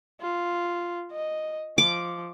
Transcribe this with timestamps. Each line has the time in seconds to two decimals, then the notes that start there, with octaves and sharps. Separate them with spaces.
0.21 F4
1.12 D#5
1.78 F3 D6